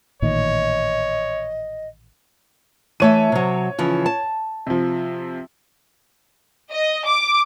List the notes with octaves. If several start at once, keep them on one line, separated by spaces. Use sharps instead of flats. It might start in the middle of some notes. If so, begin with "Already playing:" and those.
A1 A#2 D#3 C#5 D#5
E3 A3 C#5 E5 D#7
C3 F#3
C#3 E3 F3
A5
C3 F3
D#5
D6